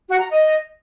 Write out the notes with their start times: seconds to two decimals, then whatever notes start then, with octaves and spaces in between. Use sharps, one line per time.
0.09 F#4
0.19 A#5
0.29 D#5